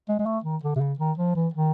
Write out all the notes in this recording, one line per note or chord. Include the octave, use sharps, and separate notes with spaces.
G#3
G#3
A3
D#3
D3
C3
C#3
D#3
F3
E3
D#3